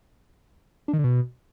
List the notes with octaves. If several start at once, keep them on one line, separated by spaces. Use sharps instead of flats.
D4
D#3
D3
B2